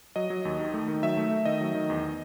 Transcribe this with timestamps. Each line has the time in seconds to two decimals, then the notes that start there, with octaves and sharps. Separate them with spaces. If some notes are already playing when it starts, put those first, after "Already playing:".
0.16 F#3 D#5
0.30 F#3
0.45 D#2
0.59 D#3
0.74 A3
0.88 D#3
1.03 F#3 E5
1.17 A3
1.31 A3
1.45 D#3 D#5
1.61 F#3
1.75 D#3
1.90 E2